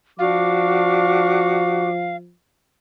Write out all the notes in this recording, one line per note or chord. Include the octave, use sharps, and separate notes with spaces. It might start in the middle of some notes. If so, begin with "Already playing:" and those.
F3 D4 F#4 F5 D6